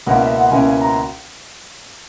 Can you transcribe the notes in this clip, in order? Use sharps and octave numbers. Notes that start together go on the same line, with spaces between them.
C#2 B2 A#3 C#4 E4 F#5
E5
F#5
C#2 B2 A#3 C#4 E4 G#5
G#5
A#5